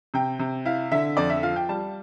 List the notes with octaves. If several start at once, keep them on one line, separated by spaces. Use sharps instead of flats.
C3 G5
C3
E4 F5
D3 E5
F2 D5
E5
F3 F5
G5
G3 A5